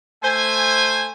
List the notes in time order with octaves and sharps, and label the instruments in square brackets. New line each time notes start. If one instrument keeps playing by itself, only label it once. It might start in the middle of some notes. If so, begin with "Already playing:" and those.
[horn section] A3 C5 G#5